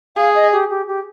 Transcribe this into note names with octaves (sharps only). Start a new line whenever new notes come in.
G#4 F5
D#5
G4
G4
G4